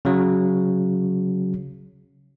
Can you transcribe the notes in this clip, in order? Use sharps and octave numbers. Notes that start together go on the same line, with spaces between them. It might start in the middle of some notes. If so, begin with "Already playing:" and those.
C#3 F#3